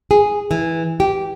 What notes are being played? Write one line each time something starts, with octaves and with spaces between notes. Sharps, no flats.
G#4
E3
G4